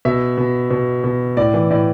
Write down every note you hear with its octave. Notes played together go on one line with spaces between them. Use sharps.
B2 E5
B2
B2
B2
A2 D5
E3
A2 D5